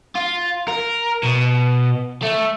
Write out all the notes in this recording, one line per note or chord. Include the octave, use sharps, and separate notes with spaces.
F4
A#4
B2
A3